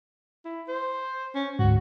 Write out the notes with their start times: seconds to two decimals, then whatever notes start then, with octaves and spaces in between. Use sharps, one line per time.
0.45 E4
0.68 C5
1.35 C#4
1.59 D2 G#2 F#4